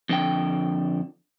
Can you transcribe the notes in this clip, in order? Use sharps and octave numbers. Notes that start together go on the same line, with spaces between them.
F2 D3 G5